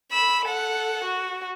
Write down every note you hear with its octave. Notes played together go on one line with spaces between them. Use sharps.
B5 E6
A4 F#5
F#4